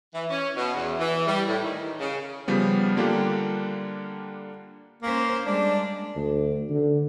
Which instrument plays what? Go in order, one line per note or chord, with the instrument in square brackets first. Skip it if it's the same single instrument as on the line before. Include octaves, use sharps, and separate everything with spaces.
[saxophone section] E3
C#4
B2
E2
E3
G3
A2
D#3
C#3
[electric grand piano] C#3 F3 G3 B3
D3 G3 A#3 D4 F4 G4
[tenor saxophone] A#3 [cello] C#4 C5
[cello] G3 G#3 [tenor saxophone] D4
[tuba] D2
D3